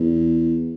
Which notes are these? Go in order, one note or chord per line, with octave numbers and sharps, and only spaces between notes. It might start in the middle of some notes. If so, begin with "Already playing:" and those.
Already playing: E2